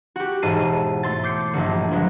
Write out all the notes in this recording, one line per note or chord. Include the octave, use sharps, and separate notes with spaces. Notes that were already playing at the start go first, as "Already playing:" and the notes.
F#4 G4
E1 G#2 A5 C7 D#7
A3 C6 A6
D6 G6 C7 C#7
A#1 G2 D3
F3 F#3 G#3 B3